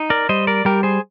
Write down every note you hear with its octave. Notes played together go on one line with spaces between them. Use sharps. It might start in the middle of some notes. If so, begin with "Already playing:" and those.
Already playing: D#4
A#4 D5
G3 C5 D#5
A#4 D5
G3 G4 A#4
G#4 C5